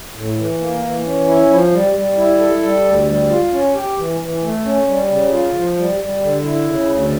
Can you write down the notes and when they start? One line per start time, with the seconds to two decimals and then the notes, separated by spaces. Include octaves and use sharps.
0.15 A2
0.38 E3
0.60 A#3
0.83 E3
1.05 C#4
1.28 E4
1.50 F3
1.72 G3
1.95 G3
2.17 E4
2.40 A4
2.62 G3
2.85 D2
3.07 G3
3.30 F4
3.53 C#4
3.75 G4
3.97 E3
4.20 E3
4.42 A3
4.65 C#4
4.87 G3
5.10 C#3
5.32 F4
5.55 F3
5.77 G3
6.00 G3
6.22 D3
6.44 E4
6.67 C#3
6.90 D2